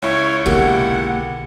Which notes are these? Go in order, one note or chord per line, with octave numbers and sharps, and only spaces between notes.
C#2 E4 C#5
B1 D3 G#3 A#3 G4 F#5